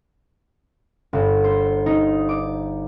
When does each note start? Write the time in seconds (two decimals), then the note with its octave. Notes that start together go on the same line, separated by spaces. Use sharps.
1.13 G1
1.44 C5
1.86 D#4
2.29 D6